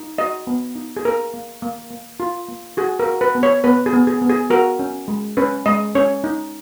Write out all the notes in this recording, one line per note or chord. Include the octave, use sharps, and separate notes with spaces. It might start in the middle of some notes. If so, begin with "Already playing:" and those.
Already playing: D#4
F#4 D#5
B3
D#4
G#4
A#3 A#4
A#3
A#3
A#3
F4
A#3
F#4 G#4
A#4
F#4
B4
B3
C#5
B3 B4
G#4
B3
G#4
B3
G#4
F#4 A#4
C#4
G#3
C#4 B4
G#3 D#5
C#4 C#5
D#4